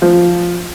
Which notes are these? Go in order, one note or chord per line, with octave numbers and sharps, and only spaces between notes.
F3